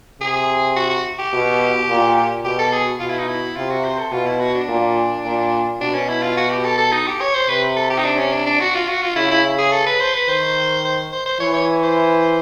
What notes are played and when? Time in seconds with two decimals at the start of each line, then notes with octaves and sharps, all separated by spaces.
0.20 C3 G#4
0.76 F#4
0.90 F#4
1.19 G4
1.33 B2
1.89 A#2
2.45 B2 G4
2.59 A4
2.73 G#4
3.00 B2 F4
3.10 E4
3.18 D#4
3.28 E4
3.56 C3 F4
3.70 F#4
3.85 C5
3.99 A4
4.12 B2 F4
4.27 E4
4.40 F#4
4.55 D4
4.68 A#2
5.24 A#2
5.81 B2 D4
5.94 C#4
6.09 E4
6.23 F4
6.37 F#4
6.50 G4
6.65 A4
6.78 A4
6.92 D#4
7.07 G4
7.21 C#5
7.35 C5
7.49 C3 B4
7.76 A4
7.90 G4
7.98 D#4
8.05 D4
8.18 C#4
8.32 D4
8.46 D4
8.60 F#4
8.75 F4
8.88 F#4
9.02 F4
9.16 C#3 E4
9.31 E4
9.59 G#4
9.73 A4
9.86 B4
10.00 C5
10.14 B4
10.28 D#3 C5
10.85 C5
11.12 C5
11.26 C5
11.40 E3 C#5
11.54 C#5
11.83 C5